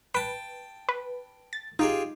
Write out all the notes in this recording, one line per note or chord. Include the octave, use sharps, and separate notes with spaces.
B4 G5 A5
B4
A6
D#4 F4 G4 G#4